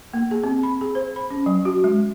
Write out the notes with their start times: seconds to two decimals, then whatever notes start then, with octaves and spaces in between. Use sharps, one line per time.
0.14 A#3
0.31 G#4
0.44 C4
0.63 B5
0.81 G#4
0.95 C5
1.16 B5
1.31 C#4
1.46 F#3
1.65 F#4
1.84 G#3